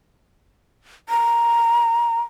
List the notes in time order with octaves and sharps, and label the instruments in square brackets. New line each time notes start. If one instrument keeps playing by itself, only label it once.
[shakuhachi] A#5